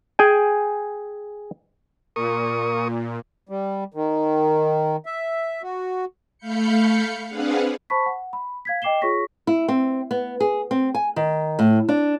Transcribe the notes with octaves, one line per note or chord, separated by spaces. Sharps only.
G#4 G5 G#5
A#2 A#4 C#6 D#6
G3
D#3
E5
F#4
A3 F5 B5 G6 C#7
C4 D4 G#4 B4 F5 F#5
C5 A5 B5 C#6 B6
F#5
B5
F5 G#6 B6
D#5 G5 D6 C7 E7 G7
F4 G#4 C#5 C#6 A#6 B6
E4
C4
B3
G#4
C4
G#5
D#3
A2
D4